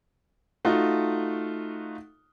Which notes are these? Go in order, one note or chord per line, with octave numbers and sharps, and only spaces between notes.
A3 D#4 F4 F#4